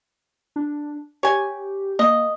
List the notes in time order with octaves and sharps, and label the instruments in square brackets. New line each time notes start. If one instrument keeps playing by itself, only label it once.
[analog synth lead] D4
[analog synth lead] G4 [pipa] C#5 G#5
[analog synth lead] A#3 [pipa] D#5